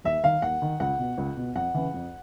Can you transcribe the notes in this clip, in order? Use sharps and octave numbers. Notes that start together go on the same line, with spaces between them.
D#2 E5
D#3 F5
D#2 F#5
D#3
C#2 F#5
B2
C#2
B2
F2 F#5
C#3 E3
F2